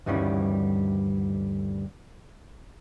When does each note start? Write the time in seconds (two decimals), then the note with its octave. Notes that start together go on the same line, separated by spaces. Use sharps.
0.06 D2 G2 D#3 E3 G3 C#4